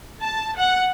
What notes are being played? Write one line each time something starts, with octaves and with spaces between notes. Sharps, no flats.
A5
F#5